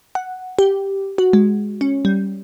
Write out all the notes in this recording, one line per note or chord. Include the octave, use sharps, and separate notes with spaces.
F#5
G4
F#4
G#3
C#4
G3